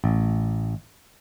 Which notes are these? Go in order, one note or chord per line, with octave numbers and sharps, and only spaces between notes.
A1